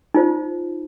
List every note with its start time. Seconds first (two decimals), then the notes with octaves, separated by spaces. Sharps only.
0.14 D#4 F4 C5